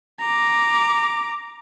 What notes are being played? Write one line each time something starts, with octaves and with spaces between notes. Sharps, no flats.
A#5 D6